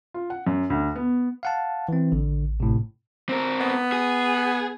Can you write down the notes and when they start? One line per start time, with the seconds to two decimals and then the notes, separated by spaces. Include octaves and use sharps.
0.14 F4
0.30 F#5
0.47 F#2
0.70 D2
0.96 B3
1.43 F5 F#5 A5
1.89 E3 C4
2.12 A1 D3
2.60 A2 C3
3.29 C4 A#4
3.60 B3
3.92 G#4